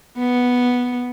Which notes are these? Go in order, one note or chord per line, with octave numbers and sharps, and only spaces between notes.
B3